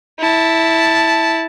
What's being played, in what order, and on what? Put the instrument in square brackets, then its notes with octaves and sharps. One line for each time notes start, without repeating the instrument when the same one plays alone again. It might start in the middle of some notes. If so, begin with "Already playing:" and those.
[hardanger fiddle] E4 A5